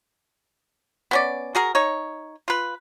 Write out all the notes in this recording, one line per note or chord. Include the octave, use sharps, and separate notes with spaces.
B3 C#4 D5
F#4 G#4 A#4
D#4 C#5
F4 B4